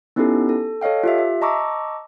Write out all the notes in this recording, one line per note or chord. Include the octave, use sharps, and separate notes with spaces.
B3 C#4 D#4 E4 G4 A4
A4
A4 C#5 D#5 F5 G5
F4 G4 E5
E5
D#5 A5 A#5 C#6 D6 E6